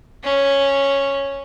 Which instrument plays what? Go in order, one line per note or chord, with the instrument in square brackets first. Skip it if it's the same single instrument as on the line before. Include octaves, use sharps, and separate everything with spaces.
[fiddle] C#4